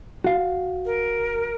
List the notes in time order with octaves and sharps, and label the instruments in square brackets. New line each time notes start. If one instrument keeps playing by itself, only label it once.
[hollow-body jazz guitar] F#4 F5
[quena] A#4